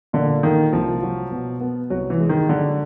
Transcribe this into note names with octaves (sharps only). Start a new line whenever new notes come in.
A#2 D3
D#3 A#3
C2 F3
F#3
B2
B3
C2 F#3
E3
G#3
D#3
D3 F#3